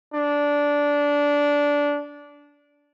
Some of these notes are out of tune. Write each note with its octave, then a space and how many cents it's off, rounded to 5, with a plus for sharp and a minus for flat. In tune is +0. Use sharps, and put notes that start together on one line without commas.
D4 -15